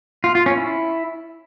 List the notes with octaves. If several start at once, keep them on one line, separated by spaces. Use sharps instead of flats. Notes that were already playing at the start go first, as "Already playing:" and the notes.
F4
F4
C#4
E4